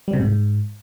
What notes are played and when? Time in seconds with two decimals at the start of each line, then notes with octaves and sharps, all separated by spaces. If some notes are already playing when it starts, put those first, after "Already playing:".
0.08 G3
0.13 C3
0.19 G#2